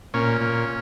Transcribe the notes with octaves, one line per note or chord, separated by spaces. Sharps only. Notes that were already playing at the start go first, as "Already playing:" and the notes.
A#2 C#4
A#2